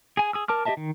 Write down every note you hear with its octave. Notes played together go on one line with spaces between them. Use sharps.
G#4 G#5
G#4 D#6 E6
A#4 A5 D6 F6
G4 G#4 D#5 E5 A5
D#3